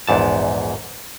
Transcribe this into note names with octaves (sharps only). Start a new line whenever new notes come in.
A#1 E2 G#2 A5